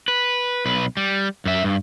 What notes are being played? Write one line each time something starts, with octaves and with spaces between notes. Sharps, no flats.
B4
B1 B4
G3
F#2 E5
G2